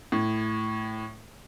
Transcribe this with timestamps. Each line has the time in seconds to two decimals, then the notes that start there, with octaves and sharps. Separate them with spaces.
0.12 A2